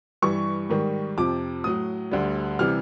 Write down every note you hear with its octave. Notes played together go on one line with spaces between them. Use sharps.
G2 E3 G3 C#6
G#2 D#3 G3
F2 C3 F3 D6
A2 F#3 D#6
D2 D3 G3
C3 E3 G3 F6